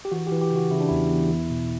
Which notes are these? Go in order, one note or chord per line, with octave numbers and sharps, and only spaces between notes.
G4
E3 F#4
G4
E3
G4
C#3 F#4
C#3 E4
D4
E2 E4
E2
E2
B2